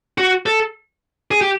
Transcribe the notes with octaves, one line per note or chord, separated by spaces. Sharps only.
F#4
A4
G#4
G4